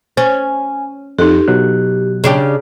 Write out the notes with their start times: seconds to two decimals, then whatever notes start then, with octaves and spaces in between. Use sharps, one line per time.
0.17 C#4 C5 G#5
1.19 F2 D#4 G4 A4
1.48 B2 F#3 F#6
2.24 C#3 D4 G4